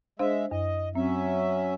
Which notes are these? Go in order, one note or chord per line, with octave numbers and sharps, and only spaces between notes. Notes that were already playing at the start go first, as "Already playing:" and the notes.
G#3 D4 C5 E5 F5
F#2 D#5
F#3 C4 C#4 E5